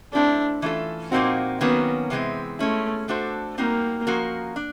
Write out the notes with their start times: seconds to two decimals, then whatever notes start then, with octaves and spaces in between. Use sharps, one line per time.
0.13 A3 C4 D4 E4 A4
0.62 E3 A3 C#4 F4 A4
1.12 A#2 F3 A#3 C4 D#4 F#4
1.60 D#3 F#3 A#3 B3 C#4 F#4
2.10 C3 E3 G#3 C4
2.59 G#3 A3 C#4 E4
3.08 A3 D4 F#4 A4 C5
3.58 G3 A#3 C4 D#4 F#4 A#4
4.07 F3 A#3 C#4 F#4 A#4
4.56 D4